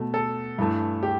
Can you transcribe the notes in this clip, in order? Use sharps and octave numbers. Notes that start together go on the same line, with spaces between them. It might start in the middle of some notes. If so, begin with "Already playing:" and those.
Already playing: B2 A3
A4
G2 E3 A3
G4